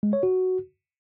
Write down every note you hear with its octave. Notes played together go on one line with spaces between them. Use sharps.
G#3
C#5
F#4